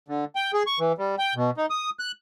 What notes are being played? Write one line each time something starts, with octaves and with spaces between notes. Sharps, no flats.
D3
G5
G#4
C#6
E3
G3
G5
B2
D#4
D#6
F#6